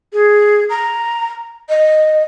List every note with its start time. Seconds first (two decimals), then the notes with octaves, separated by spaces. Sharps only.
0.12 G#4
0.69 A#5
1.69 D#5